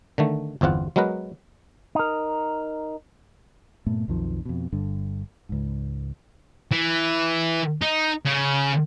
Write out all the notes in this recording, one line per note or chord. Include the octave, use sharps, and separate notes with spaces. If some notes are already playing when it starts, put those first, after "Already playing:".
D3 D#3 A3
G1 E2 C4 F4 F#5
F#3 G#3 B3 A#4 B4
D#4 A#4
G2 A#2 A3 B3
B1 F2 D#3 F3
F2 B2
G1 G2 D3
C#2 G#2
E3
D#4
C#3